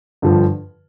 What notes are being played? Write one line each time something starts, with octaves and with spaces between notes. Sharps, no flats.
G2 D3 F3